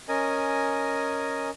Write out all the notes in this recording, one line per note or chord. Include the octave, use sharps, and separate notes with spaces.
C#4 A#4 D#5 G#5